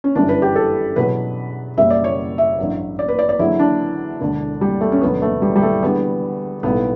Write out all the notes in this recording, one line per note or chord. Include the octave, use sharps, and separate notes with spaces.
C#4
G1 F#2 E3 G3 D4
B4
G4
A4
E2 B2 F#3 B4
F#1 F#2 C#3 G3 E5
D5
C#5
E5
A1 G2 F#3
D5
B4
D5
D5
E2 D3 F#3 E4
D4
E1 D2 D3
G3
A3
C#4
E1 D2 D3 F#3 B3
A3
G3
G3
A3
E2 D3 G3 B3
B1 A2 G3 B3